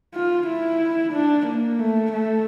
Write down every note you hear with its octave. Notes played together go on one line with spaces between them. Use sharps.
F4
E4
D4
A#3
A3
A3